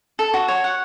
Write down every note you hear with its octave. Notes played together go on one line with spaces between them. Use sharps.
A4
F#4
C#5
F#5